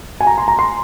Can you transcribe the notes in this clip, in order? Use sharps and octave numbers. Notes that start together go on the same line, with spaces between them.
G#5
A#5
C6
A#5
C6